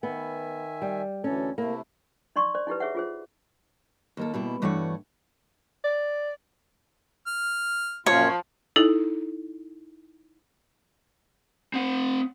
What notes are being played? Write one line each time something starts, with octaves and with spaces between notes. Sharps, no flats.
D#3 B3 E5 G#5
G3
D2 E3 C#4 A4
C3 A3 A#3 E4
D#4 D5 C6 C#6
C5 D5
D#4 E4 G4 B4
G#4 C#5 E5 F#5
F4 G#4 C5
D#2 A#3 A4
B2 G3 E4
G2 E3 A3 F#4 C#5 F#5
D5
F6
F#2 A#2 F3 F4 C#5
D#4 E4 A4
C4 F#5